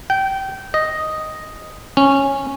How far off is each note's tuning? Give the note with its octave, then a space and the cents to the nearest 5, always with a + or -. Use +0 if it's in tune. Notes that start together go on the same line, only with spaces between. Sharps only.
G5 -20
D#5 +0
C#4 -10